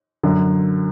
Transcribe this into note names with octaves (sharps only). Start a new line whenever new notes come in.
F#2 D3